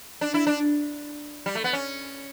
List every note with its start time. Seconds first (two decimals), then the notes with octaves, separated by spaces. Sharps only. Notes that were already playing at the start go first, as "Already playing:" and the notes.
0.21 D4
0.34 E4
0.47 D4
1.46 G3
1.55 A3
1.64 B3
1.73 C#4